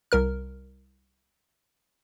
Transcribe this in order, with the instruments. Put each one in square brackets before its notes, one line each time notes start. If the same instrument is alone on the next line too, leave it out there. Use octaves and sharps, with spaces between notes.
[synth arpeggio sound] C2 A#4 F6